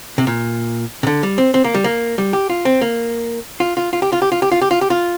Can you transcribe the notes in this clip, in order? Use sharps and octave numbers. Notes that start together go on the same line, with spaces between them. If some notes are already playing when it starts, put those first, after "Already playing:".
C3
A#2
C3
D3
G3
C4
C4
A#3
G3
A#3
G3
G4
F4
C4
A#3
F4
F4
F4
G4
F4
G4
F4
G4
F4
G4
F4
G4
F4